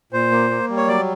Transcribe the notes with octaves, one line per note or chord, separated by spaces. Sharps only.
A#2 C5
A#3
A#3
G3
C#5
F#3 D5